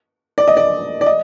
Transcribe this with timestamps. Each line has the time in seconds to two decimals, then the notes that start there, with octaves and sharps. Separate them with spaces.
0.38 D5
0.48 D#5
0.57 D5
1.01 D5
1.06 D#5